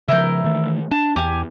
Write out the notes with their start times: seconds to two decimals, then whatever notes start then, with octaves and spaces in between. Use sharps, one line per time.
0.08 C#3 F3 E4 A#4 G6
0.44 D#3 E3 A3
0.91 D4 A5
1.16 E2 G4 G#5